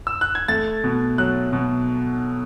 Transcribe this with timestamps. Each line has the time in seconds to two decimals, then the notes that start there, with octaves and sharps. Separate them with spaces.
0.07 E6
0.21 F#6
0.35 G#6
0.48 A3 A6
0.84 B2
1.18 F#3 F#6
1.53 B2